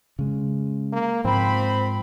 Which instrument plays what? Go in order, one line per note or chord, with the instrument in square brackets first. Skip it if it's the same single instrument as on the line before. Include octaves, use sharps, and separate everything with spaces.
[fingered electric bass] C#3 G#3
[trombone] A#3
[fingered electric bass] G#2 F3 [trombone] C4 [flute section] B5